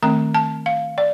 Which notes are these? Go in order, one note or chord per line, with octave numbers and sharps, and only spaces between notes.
D#3 A3 C4 A#5
A5
F5
D5